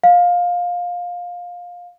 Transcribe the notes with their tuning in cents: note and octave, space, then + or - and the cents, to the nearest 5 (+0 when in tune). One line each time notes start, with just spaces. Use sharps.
F5 +20